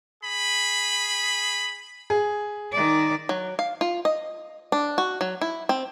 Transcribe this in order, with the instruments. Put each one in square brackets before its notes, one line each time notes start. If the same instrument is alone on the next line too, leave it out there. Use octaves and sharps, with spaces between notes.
[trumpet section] G#4 B5
[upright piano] G#4
[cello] D#3 D5
[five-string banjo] F#3
F5
F4
D#5
D4
F#4
F#3
E4
C4